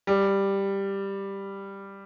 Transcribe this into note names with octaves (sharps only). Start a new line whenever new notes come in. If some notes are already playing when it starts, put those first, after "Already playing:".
G3